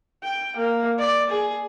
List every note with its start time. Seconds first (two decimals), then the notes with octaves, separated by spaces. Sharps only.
0.24 G5
0.57 A#3
0.99 D5
1.30 G#4